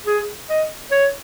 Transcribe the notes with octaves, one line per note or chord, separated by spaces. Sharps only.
G#4
D#5
C#5